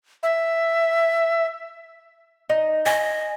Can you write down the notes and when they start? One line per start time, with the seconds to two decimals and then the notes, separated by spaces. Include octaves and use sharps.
0.23 E5
2.50 D#4
2.86 D#5 G#5